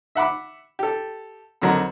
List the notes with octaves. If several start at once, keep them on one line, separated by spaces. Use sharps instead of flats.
E5 F#5 B5 D6
G4 A4
F2 D3 F#3 A#4 D#5